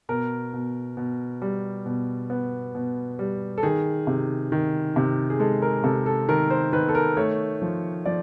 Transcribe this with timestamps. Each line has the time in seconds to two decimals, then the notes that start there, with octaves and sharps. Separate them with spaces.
0.09 B2 A#4
0.53 B2
0.97 B2
1.42 G3
1.86 B2
2.30 B3
2.75 B2
3.19 G3
3.58 A4
3.63 D#3 G#4
4.07 C3
4.52 D#3
4.96 C3
5.30 G#4
5.40 G#3 A4
5.62 A#4
5.84 C3 A4
6.06 A4
6.28 D#3 A#4
6.50 C5
6.73 D#3 B4
6.89 A4
6.95 A#4
7.17 A3 C#5
7.62 F3
8.06 F3 D5